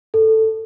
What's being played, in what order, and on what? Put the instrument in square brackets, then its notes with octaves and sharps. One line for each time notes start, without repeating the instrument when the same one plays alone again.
[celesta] A4